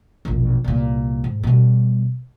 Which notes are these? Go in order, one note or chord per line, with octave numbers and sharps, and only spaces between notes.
E1 A#1
C2 A#2
G#2
B2 G3